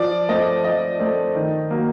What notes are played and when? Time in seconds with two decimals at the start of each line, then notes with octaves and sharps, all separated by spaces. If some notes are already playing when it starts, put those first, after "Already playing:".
Already playing: F3 D5
0.29 A3 C4 D#5
0.64 F3 D#5
1.00 A3 C4
1.35 D#3
1.70 F#3 A#3